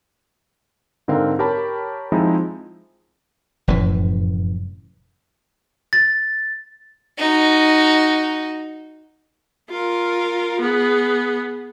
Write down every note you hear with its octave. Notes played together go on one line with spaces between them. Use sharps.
G#2 D3 C4 A#4 F5
G4 A#4 C#5 A5 B5
F3 G#3 C4 D#4 E4
F1 F#2 A2 E3
A6
D#4 F#4
F4 A#4
B3 G#4